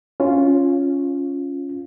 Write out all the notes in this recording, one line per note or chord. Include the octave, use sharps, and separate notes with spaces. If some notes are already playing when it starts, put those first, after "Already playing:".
C#4 F4